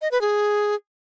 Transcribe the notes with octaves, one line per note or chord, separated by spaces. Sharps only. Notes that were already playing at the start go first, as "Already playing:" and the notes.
D#5
B4
G#4